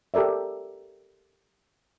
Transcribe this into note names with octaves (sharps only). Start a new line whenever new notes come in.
G4 A4 A#4 D5 E5